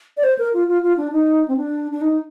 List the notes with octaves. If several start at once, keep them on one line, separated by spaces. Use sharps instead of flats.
D5
C5
A#4
F4
F4
F4
D4
D#4
C4
D4
D4
D#4